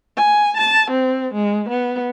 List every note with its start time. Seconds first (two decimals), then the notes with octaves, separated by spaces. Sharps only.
0.17 G#5
0.58 A5
0.91 C4
1.35 G#3
1.70 B3